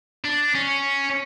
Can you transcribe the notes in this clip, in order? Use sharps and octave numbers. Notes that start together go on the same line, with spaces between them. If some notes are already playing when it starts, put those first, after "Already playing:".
D4
C#4